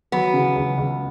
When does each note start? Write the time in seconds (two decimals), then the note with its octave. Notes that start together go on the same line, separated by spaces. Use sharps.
0.12 F#3 B3
0.34 C#3
0.56 C#2
0.77 C#2